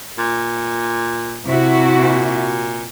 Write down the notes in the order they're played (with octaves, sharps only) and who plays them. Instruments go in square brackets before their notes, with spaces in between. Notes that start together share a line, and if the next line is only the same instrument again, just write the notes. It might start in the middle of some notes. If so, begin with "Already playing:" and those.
[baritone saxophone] A#2
[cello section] C3 E4 F#4
[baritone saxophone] A#2